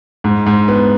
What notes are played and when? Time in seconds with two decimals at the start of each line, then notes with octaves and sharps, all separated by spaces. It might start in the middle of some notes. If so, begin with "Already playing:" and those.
0.24 G#2
0.46 G#2
0.68 B3